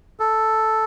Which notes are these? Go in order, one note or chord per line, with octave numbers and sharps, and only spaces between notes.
A4